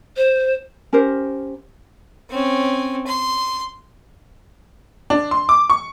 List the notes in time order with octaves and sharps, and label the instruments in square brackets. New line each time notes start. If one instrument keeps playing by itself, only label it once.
[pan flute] C5
[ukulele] C#4 G4 A#4 C5
[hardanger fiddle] C4 C#4
C6
[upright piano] D4
C6
D6
C#6